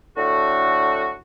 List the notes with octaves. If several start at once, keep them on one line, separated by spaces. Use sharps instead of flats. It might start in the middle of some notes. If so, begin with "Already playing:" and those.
A2 D3 F#4